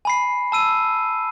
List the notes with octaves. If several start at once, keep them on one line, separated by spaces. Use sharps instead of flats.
G#5 B5 C7
A5 E6 D#7